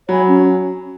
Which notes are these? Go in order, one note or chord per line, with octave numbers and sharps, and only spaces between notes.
F#3 C#5 G#5 B5
C#4